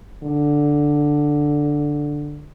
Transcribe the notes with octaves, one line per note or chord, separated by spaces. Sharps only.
D3